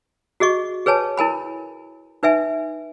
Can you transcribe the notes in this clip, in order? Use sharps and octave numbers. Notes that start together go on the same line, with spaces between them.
F#4 G#4 D#5 C#6
G#4 B4 C#5 G#5 A5
E4 A#4 G#5 B5
D#4 B4 E5 G#5